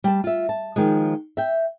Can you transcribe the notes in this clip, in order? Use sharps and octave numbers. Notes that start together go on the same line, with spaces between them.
G3 A5
F4 E5
A5
D#3 F3 G#3
E5 G5